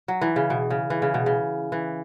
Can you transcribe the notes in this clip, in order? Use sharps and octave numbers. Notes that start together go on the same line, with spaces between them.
F#3
E3
C#3
B2
C#3
E3
C#3
B2
C#3
E3